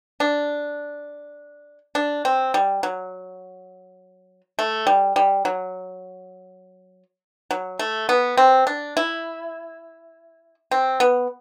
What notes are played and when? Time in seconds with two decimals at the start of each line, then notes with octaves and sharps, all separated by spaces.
0.20 D4
1.95 D4
2.25 C4
2.54 G3
2.83 F#3
4.59 A3
4.87 G3
5.16 G3
5.45 F#3
7.51 F#3
7.79 A3
8.09 B3
8.37 C4
8.67 D4
8.97 E4
10.71 C4
11.00 B3